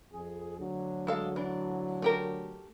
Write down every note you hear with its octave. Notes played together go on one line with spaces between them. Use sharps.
F2 G#4
D2 D3 F#3
G#3 A4 F5
E3 D4
A3 G4 A#4